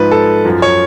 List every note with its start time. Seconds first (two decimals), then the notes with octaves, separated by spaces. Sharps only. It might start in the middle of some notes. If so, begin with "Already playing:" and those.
Already playing: G#2 F3 B4
0.12 A4
0.45 F#2 F3
0.62 C#5